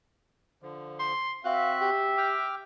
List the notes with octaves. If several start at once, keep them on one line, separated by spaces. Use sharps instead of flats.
D3 F3
C6
C4 F#4 E5 F5 F#6
G4
G5 D6 F6